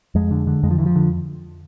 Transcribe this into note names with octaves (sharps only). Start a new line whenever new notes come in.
F2 G#3
D3
D3
F2 G#3
F3
F2 E3
F3
D3